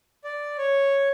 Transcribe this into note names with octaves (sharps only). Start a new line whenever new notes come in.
D5
C#5